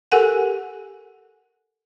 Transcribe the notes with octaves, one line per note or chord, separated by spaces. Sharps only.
G4 A4 A#4 F#5 G#5